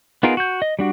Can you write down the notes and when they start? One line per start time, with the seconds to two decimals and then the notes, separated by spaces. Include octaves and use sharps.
0.23 B3 D#4 F4 G#4 A#4
0.37 F#4 G6
0.62 D#5
0.79 G3 D4 F#4